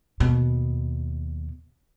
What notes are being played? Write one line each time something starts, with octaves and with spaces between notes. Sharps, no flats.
D#2 B2